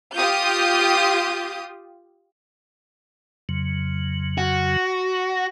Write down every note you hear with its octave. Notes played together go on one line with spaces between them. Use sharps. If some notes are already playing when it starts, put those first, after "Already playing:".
F4 G4 D#6 G6
F2 C#3 F#3
F#4